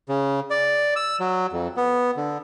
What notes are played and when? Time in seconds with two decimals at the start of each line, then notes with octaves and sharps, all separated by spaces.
0.09 C#3
0.50 D5
0.96 E6
1.20 F#3
1.52 F2
1.77 B3
2.17 D3